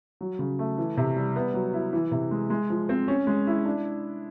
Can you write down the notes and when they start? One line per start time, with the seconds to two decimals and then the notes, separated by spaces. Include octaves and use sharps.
0.21 F#3
0.39 C#3
0.59 A3
0.78 E3
0.97 C3
1.16 G3
1.36 B3
1.54 F#3
1.73 E4
1.93 E3
2.11 C3
2.31 G#3
2.50 G#3
2.70 F3
2.89 C4
3.08 C#4
3.27 G#3
3.47 E4
3.65 D4